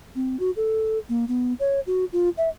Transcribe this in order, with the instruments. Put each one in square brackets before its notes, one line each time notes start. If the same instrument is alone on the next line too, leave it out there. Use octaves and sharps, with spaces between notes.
[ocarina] C4
F#4
A4
A#3
B3
C#5
F#4
F4
E5